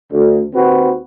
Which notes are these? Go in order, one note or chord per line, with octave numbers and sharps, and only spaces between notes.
D2
D#2 C4 F#4 B4